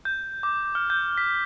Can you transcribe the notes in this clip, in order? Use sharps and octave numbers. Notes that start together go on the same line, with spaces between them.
G6
D6
F6
G6
B6